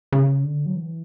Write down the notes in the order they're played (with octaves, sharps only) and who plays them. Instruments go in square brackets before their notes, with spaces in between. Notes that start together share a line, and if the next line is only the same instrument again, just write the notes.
[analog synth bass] C#3
D3
F#3
E3